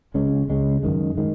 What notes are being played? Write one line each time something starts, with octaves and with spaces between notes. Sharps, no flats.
C#2 C#3 G#3 C#4
C#2 C#3 G#3 C#4
F#2 D#3 G#3
D#3 G#3